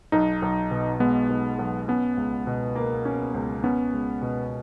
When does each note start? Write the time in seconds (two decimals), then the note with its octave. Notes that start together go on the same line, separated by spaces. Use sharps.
0.12 B1 D#4
0.42 B1
0.71 B2
1.00 G#3 B3
1.30 B1
1.59 B1
1.88 B3 C#4
2.17 C#2
2.47 B2
2.76 A#3
3.05 C#4
3.34 C#2
3.64 B3 C#4
3.93 C#2
4.22 B2